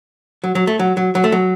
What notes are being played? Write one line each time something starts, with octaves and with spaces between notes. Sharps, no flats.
F#3
F#3
A3
F#3
F#3
F#3
A3
F#3